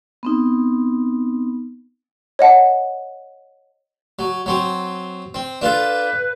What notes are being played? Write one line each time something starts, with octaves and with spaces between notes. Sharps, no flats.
B3 C4 D#4
C#5 D#5 F#5 A5
F#3
F#3 C4
C4
D4 F4 A4 B4